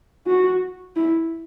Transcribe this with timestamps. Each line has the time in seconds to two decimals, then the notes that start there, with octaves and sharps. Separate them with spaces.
0.26 F#4
0.96 E4